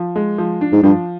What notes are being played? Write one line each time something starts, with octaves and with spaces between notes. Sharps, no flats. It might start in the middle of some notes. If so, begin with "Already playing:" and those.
Already playing: F3
G#3
F3
D4
G#2
G2 F3